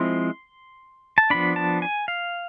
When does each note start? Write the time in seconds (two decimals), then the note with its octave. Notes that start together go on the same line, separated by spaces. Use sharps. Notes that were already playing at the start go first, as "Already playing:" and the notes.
Already playing: F3 G#3 C4 E4 C6
1.18 A5
1.30 F3 B3 D4 B5
1.56 A5
1.82 G#5
2.08 F5